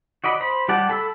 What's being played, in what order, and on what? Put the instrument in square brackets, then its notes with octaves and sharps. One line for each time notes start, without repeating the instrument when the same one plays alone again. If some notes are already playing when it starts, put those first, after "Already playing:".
[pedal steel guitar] F#4 D5 D#5 B5
C5 B5
G3 G4 D5 F#5 A5
A4 B5 E6